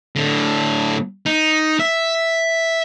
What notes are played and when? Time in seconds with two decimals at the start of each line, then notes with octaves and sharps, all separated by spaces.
0.16 A2 D3
1.26 D#4
1.80 E5